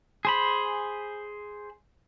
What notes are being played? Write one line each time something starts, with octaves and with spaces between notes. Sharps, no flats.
G#4 C5 B5